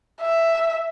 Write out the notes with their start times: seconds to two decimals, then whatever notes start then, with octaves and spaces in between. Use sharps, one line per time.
0.22 E5